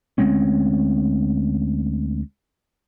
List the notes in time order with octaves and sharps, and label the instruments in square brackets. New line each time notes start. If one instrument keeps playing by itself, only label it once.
[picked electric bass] D2 G#3 C4 C#4